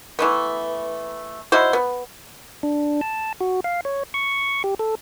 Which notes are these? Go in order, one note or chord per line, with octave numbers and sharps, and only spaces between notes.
E3 A3 B3
D#4 E4 F#4 C5
B3
D4
A5
F#4
F5
C#5
C#6
G4
A4